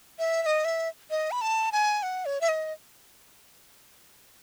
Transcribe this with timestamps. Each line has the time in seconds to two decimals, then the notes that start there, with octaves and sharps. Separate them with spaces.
0.19 E5
0.43 E5
0.46 D#5
0.65 E5
1.11 D#5
1.31 B5
1.41 A5
1.72 G#5
2.03 F#5
2.26 C#5
2.41 E5
2.49 D#5